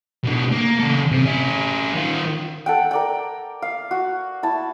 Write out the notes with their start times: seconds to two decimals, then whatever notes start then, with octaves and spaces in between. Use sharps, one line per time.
0.24 B2 D3
0.52 A#3
0.80 C#3 A4
1.12 C3
1.26 C#4 E4
1.94 D#3 F4
2.66 A4 F#5 G5
2.91 A#4 D5 G5
3.62 F5
3.91 F#4
4.43 E4 A5